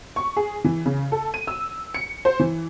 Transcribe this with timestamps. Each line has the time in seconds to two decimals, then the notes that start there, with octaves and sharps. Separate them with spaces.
0.16 C#6
0.36 G#4
0.64 E3
0.86 C#3
1.12 A4
1.34 D#7
1.47 E6
1.94 C#7
2.25 C5
2.40 E3